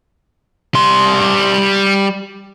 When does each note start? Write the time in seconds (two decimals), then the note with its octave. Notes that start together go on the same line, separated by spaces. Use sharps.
0.75 G3 C6